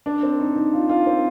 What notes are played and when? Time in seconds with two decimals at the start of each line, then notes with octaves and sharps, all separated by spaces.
0.06 D4
0.23 C4
0.40 D#4
0.56 D#4
0.73 F4
0.89 F4
1.07 C4